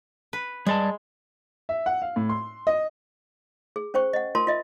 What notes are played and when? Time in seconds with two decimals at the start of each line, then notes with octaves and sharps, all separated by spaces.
0.33 B4
0.67 G3 G#3 D5 A5
1.69 E5
1.86 F#5
2.02 F5
2.16 A2
2.29 C6
2.67 D#5
3.76 G#4
3.94 C#4 C5 G5 C#6
4.13 D#5 F#5
4.35 F4 A#4 A5 C6
4.47 F4 D#5 E5